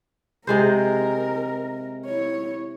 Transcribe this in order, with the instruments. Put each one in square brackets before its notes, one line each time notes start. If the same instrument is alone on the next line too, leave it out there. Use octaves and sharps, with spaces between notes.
[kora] C3 G#3 C5 [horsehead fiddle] A#4
[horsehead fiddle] E4 C#5